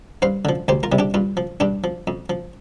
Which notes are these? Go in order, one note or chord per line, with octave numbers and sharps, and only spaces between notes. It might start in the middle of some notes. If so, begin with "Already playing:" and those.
G2 C5 F5
D3 F3
D2 G4 C5
F4 A#4
C3 G3
D4 G4
G2 F4
F3
G2 D4 G4
F3
F2
F3